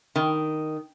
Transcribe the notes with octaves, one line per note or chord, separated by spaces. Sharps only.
D#3